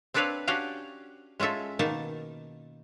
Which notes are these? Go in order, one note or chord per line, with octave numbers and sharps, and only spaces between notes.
C4 D4 A4 B4 C#5 F5
C#4 D4 F#4 G4 F5 G5
G#3 C#4 F4 A4 E5
B2 D#3 A#3 D#4 A5